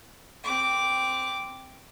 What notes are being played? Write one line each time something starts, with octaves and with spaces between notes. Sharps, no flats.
C4 D6